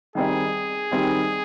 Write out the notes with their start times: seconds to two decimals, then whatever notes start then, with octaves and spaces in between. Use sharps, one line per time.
0.15 D#3 G3 C4 D#4 G#4
0.92 D#3 G3 C4 D#4